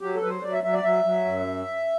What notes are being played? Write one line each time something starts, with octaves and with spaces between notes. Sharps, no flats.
F#3 G4
A4
F#3 B4
C5
F#3 D5
E5
F#3 E5
D5
F#3 E5
F#3
F#2